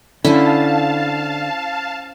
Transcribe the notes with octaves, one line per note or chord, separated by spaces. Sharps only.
D3 C#4 E4 C5 F5 G#5 A5